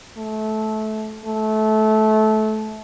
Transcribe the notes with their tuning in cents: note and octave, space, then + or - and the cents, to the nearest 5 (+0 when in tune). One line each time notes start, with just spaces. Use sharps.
A3 -20
A3 -20